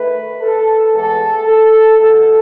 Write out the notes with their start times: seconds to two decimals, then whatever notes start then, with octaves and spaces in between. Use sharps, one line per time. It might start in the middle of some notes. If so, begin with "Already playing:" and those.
Already playing: D#3 A3 B4
0.42 A4
0.93 A2 E3 G#3 B3 A4
1.47 A4
1.99 B2 A3 A4